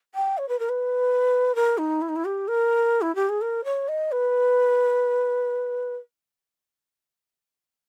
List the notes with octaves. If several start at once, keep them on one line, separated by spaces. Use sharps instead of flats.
G5
C#5
B4
A#4
B4
A#4
D#4
E4
D#4
E4
G4
A#4
E4
G4
G#4
A#4
C#5
D#5
B4